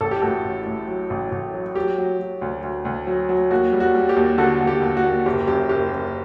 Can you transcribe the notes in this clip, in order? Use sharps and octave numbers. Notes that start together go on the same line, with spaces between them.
A1 A4
G4
A2 F#4 A4
A1
A2
F#3
A1
A1
F#3
F#3 G4
F#3
F#3
D2
D2
D2
F#3
F#3
D#2 F#4
G3
F#4
G3
G4
D#2
D3 F#4 A4
D#2
G4
D#2
F#4
D#2
F#1 G4
F#2 G4
F#1 G4
F#2